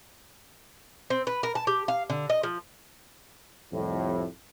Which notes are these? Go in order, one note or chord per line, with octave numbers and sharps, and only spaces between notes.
C4
B4
A#4
A5
G4
F5
D3
D#5
F3
C2 F2 A2